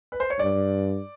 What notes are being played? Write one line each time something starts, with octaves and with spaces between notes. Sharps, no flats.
B4
C5
C#5
G2 D5